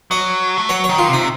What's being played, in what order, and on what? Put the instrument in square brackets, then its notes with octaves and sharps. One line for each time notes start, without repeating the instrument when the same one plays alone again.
[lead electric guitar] F#3 [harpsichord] D#5
[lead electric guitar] A3
[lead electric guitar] F#3 [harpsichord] C#5
[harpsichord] C#5
[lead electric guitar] D#3
[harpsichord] F4
[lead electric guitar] C3
[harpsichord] D#4